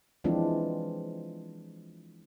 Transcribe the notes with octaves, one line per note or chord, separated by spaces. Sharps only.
E3 F3 G#3 C4 D4 F4